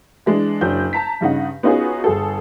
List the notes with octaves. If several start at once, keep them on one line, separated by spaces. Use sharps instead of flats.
E3 G#3 D4
F#1 F#3 D4 G6
A5 A#5 B6
G2 C#3 D#4 F#5
B3 C#4 D#4 F4 F#4 G#4
G1 G#4 A4